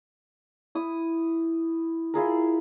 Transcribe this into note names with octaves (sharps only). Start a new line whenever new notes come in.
E4 D#6
E4 F4 G#4 A#4